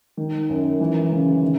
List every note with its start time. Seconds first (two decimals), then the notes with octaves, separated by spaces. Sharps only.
0.17 D#3
0.49 F#2
0.80 E3
1.12 C#3
1.42 D#3